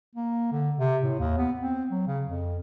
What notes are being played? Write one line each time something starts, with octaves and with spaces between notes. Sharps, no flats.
A#3
D3
C3
A2
D#2
B3
C4
F#3
C#3
F2